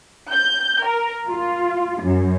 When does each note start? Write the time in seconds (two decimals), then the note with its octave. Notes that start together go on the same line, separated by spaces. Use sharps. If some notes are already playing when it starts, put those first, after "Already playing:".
0.32 G6
0.86 A#4
1.28 F4
2.04 F#2